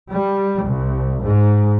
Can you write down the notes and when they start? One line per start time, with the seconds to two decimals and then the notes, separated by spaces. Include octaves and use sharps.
0.13 G3
0.66 C2
1.26 G#2